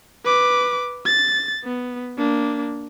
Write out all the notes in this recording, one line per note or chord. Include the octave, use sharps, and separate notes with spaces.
B4 D6
A6
B3
A#3 D4